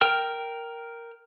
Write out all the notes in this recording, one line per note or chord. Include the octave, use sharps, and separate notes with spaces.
A#4 G5 F6